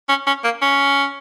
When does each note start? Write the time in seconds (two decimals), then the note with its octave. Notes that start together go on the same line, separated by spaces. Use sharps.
0.09 C#4
0.27 C#4
0.44 A#3
0.62 C#4